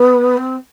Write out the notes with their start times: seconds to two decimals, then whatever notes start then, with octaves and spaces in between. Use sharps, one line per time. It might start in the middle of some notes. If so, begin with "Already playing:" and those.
Already playing: B3
0.37 C4